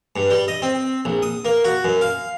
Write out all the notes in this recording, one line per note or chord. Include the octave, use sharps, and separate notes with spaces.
G2
G3
D#5
C4
A#1
D#6
A#3
F#4
F#2
F5